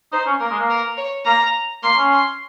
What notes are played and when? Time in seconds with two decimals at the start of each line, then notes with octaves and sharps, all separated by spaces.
0.12 D#4 C5
0.26 C#4
0.40 A#3 A#4
0.51 G#3
0.59 A#3
0.70 A#4
0.97 C#5
1.25 A#3 A#5
1.83 A#3 C6
1.97 C#4
2.12 C6